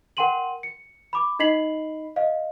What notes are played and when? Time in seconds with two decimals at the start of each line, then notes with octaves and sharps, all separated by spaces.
0.17 A#4 F#5 G5 C6 D#7 F#7
0.63 C#7
1.13 B5 D6
1.39 D#4 D#5 B5 B6 C7 F#7
2.16 D#5 F5